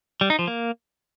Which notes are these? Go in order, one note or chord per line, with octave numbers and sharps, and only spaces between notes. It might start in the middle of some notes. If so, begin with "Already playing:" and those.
G3
D#4
F3
A#3